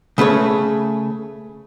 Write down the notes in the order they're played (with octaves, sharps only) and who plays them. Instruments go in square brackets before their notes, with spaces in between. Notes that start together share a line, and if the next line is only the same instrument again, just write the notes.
[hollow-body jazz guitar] C#3 A3 B4 C#5